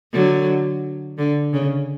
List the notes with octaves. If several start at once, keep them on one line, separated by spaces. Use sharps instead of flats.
D3 F#3
D3
C#3